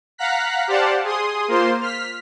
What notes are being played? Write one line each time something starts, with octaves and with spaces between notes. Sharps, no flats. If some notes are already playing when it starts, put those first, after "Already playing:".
F5 F#5 A#5 F#6 B6
G4 C5 D5 F5 F#5 A5
G#4 C6 D#6
A#3 F4 C5 C6
F6 B6